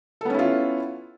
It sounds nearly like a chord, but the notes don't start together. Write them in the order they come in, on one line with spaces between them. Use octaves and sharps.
A4 B3 C#4 E4 F4